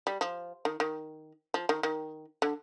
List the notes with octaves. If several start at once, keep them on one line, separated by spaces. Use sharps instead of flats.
G3
F3
D#3
D#3
F3
D#3
D#3
D3